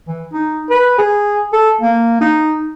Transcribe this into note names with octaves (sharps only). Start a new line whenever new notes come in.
E3
D#4
B4
G#4
A4
A#3
D#4